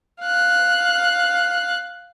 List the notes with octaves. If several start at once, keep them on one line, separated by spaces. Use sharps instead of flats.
F5 F#6